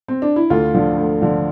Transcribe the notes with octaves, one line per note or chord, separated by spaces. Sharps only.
C4
D4
E4
D2 F4
D3 F3
D2
D3 F3